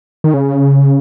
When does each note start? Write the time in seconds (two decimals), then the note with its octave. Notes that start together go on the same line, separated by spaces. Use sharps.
0.24 D#3
0.34 C#3